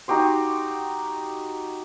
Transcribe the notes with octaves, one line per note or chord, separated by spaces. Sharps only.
D#4 F#4 G4 C6